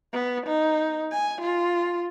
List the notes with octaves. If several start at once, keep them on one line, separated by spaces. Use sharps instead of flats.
B3
D#4
G#5
F4